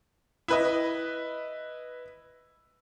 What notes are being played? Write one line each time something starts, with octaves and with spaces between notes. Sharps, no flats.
E4 B4 D#5